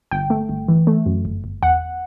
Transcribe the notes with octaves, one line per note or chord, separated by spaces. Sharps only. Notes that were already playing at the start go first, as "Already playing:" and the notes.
G1 G5
A3
G1
E3
A3
F#2
G1
G1
E2 F#5